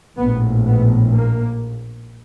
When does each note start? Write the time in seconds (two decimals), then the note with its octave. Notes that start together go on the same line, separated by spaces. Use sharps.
0.17 A#1 A2 B3
0.65 B3
1.12 A#3